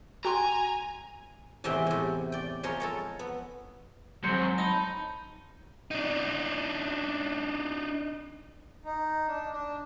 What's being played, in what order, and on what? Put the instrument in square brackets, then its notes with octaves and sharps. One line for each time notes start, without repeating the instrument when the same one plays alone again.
[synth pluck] F#4 G5 C6 [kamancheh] G#5 [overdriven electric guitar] A#5
[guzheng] E2 A2 C3 G#3 E5 G5
A2 C3
D5 G5
F3 G#3 A#4 C#5 C6
A4 A#4 C#5
B3
[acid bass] F#3 [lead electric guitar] G#3 C4 [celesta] C6 G6 C#7
[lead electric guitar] D#4 [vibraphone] A5 B5
[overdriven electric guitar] D4 D#4
[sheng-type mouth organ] D#4
D4
D4